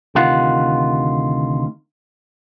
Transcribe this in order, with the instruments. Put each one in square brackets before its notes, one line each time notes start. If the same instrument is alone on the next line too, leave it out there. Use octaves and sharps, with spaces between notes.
[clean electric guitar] D2 C3 D#3 F4 F#5